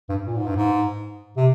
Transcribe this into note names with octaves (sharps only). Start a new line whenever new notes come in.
G2
A#2
G#2
G2
G#2
C3